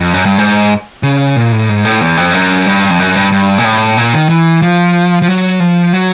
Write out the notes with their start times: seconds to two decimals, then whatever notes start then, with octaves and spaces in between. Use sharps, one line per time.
0.01 F2
0.14 F#2
0.26 G2
0.38 G#2
1.03 C#3
1.36 A#2
1.52 A2
1.69 G#2
1.85 A2
2.01 E2
2.17 F2
2.34 F#2
2.66 G2
2.90 F2
2.99 F#2
3.16 G2
3.32 G2
3.58 A#2
3.65 A2
3.97 A#2
4.13 D#3
4.29 E3
4.62 F3
5.22 F3
5.28 F#3
5.60 F3
5.93 F#3